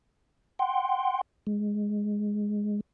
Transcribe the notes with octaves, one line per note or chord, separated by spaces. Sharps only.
F#5 G5 C6
G#3